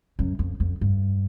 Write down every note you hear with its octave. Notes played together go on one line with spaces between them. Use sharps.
F#2
F2
F2
G2